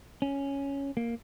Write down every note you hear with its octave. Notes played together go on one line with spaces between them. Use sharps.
C#4
A#3